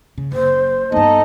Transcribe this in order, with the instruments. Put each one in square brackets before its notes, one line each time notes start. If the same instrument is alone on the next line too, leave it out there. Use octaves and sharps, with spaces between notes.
[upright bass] C#3
[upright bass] F#1 [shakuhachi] C5
[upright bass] G2 B3 [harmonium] D#4 A4 D#5